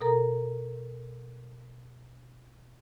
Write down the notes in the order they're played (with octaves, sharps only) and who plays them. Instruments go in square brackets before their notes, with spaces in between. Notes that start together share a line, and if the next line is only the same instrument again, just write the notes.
[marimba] B2 A4 A#4 A#5